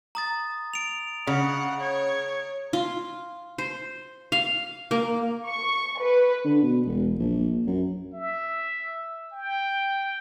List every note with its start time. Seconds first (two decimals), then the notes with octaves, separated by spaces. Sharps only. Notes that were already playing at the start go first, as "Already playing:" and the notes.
0.15 A#5 D#6 A6
0.74 D7 F7
1.27 C#3 F#5
1.80 C#5
2.73 F4
3.58 C5
4.32 F5
4.91 A#3
5.47 C#6
5.99 B4
6.45 D3
6.63 B2
6.86 E1
7.19 A#1
7.67 F#2
8.14 E5
9.33 G5